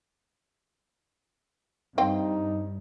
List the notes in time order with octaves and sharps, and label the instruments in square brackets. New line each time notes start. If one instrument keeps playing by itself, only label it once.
[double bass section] G2 [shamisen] C4 F5 G5 [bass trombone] D#4